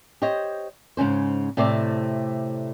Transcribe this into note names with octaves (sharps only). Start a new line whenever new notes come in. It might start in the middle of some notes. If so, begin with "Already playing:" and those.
G4 C5 C#5 D#5
G#2 C#3 C#4 C5
A2 C3 A3 C4 C5 D5